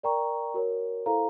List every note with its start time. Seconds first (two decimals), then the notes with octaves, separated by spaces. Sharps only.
0.03 A#4 D5 G5 A#5 C#6
0.54 F#4 A#4 C#5
1.06 E4 A4 C5 F5 A#5